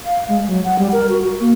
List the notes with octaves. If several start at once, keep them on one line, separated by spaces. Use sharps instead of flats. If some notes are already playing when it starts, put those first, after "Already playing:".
F5
G#3
F#3
F#5
G3
A#4
F#4
F#4
A#3